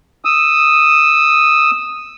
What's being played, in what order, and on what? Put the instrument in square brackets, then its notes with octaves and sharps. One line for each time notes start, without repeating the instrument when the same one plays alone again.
[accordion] D#6 E6